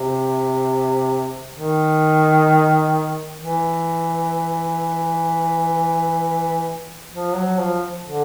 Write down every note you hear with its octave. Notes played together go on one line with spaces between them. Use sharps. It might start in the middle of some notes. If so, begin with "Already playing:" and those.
Already playing: C3
D#3
E3
F3
F#3
F3
D3